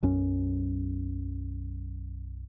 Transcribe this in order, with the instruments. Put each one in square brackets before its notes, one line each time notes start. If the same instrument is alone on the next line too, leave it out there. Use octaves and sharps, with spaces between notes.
[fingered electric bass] B1 F#2 C#4